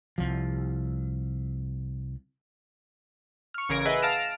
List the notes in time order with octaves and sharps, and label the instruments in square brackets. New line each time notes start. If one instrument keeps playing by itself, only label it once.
[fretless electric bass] C2 F3
[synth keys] C#6 F6
A1 C#3 A#4 G#6 A#6 D7
G#4 B4 D#5 E5 F#5
F5 A5 F6 A#6 D7 E7